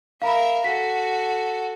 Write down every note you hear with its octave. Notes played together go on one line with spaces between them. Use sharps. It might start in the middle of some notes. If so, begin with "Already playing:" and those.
A#4 E5 F5 A#5 B5
F#4 A4 B6